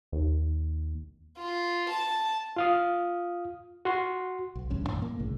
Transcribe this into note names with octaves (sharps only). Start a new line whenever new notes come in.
D#2
F4
A5
F4 F5 D#6
F#4 C6
B1
D1 A1 G2 C#4
F#2 A#2 E3
A#3
G1 C2 A2 C#3